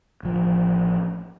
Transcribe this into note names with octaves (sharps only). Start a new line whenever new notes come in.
A1 F3